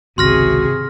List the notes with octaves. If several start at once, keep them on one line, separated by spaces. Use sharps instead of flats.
G#1 C#2 C3 F#4 G#4 C6 F6 A#6